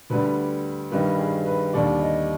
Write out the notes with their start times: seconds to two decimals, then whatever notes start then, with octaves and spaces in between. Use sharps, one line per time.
0.10 D2 D3 G3 B4
0.91 G2 D#3 G3 B4
1.18 G#4
1.45 B4
1.73 D#2 D3 G3 D5
2.00 D#5